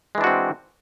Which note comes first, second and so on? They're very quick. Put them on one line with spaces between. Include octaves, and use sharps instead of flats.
G#3 E3 D4 F#4 C4